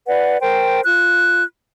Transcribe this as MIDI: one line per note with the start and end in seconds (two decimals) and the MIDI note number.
0.07 0.40 71
0.07 0.40 74
0.07 0.40 78
0.41 0.81 70
0.41 0.81 72
0.41 0.81 79
0.85 1.44 65
0.85 1.44 90